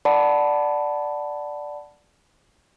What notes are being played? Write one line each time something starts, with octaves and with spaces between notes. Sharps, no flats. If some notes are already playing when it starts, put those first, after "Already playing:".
D5 F#5 A5 B5